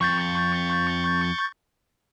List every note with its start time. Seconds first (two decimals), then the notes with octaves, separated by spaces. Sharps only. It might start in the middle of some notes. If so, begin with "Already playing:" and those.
0.01 F2 C#6 G6 A6